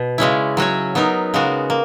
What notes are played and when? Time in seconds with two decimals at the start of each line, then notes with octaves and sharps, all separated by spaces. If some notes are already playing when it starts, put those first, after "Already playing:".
Already playing: B2
0.18 C#3 G#3 C#4 E4
0.57 F#3 C#4 F#4 C#5
0.95 F#3 B3 D#4 A#4
1.34 C#3 G#3 B3 F#4 A#4
1.70 A#3